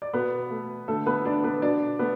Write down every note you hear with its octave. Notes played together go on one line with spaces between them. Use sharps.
D5
B2 B3 B4
A3
D3 A3 A4
B3 B4
B3 D4 D5
B3 B4
B2 D4 D5
A3 B3 B4